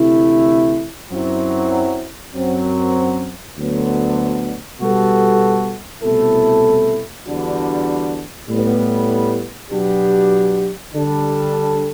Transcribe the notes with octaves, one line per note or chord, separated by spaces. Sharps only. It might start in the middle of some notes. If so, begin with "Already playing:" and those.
Already playing: D2 C3 E3 A3 E4
F#2 F#3 C4 E4
F#2 F#3 C4
D2 D3 F#3 B3
B2 G3 B3 F#4 A4
C2 B2 A3 E4 A4
E2 D3 G3 D4 F#4
A2 G3 B3
B2 F#3 B3 D4 G4
D3 G3 D4 A4